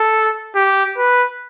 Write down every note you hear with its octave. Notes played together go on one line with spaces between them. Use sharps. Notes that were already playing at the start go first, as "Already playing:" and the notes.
Already playing: A4
G4
B4